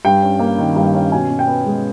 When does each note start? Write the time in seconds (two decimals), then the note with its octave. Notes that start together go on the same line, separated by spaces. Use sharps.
0.05 G2 G5
0.23 C#4
0.39 A#3
0.58 D#3
0.76 G2
0.95 C#4
1.12 B2 G#5
1.31 B2
1.39 G5
1.48 B3
1.66 G#3